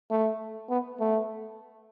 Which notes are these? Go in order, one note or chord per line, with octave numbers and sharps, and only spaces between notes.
A3
B3
A3